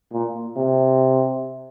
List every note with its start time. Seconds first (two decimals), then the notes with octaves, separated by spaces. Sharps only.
0.12 A#2
0.56 C3